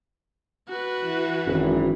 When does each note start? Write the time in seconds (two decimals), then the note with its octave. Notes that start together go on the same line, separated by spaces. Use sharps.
0.68 F#4 B4
1.01 E3
1.46 G#1 F#2